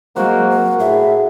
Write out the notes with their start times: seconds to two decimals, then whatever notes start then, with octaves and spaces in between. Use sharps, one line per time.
0.16 F#3 G#3 A#3 C4 F#4 C5
0.51 A#4
0.80 A2 G#4 E5